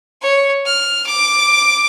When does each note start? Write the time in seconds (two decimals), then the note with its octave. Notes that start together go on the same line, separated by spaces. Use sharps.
0.21 C#5
0.66 F6
1.06 D6